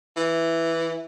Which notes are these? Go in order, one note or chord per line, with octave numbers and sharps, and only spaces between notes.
E3